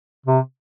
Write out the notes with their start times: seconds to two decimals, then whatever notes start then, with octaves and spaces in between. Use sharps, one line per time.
0.26 C3